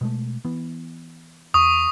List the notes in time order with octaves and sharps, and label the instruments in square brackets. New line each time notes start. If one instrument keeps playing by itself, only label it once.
[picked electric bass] B2 G#3 A3
E3 B3
[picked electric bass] E2 [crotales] C#6 D#6